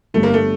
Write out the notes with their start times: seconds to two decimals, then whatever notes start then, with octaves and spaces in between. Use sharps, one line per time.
0.14 G1 G2 D3 A3
0.23 A#3
0.34 A3